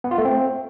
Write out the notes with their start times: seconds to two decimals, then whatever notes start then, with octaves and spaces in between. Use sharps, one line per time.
0.04 B3
0.11 F4
0.18 A3
0.25 C4